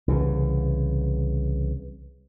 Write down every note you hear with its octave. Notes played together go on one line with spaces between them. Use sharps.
C2 C#3 E3